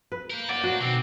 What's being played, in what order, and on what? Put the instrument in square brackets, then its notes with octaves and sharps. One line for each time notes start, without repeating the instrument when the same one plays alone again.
[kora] B4
[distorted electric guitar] A#4 F5 [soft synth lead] G6
[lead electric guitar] F#2 D5 [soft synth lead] F#5
[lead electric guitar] A2 D4 [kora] F#4
[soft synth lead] B2 [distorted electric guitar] D3 D#3 [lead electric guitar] C4